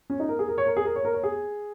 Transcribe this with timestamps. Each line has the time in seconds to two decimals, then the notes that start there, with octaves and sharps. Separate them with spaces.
0.10 C#4
0.20 D#4
0.29 A#4
0.39 G#4
0.49 A#4
0.58 C#5
0.67 A#4
0.77 G#4
0.85 A#4
0.96 C#5
1.05 A#4
1.14 C#5
1.24 G#4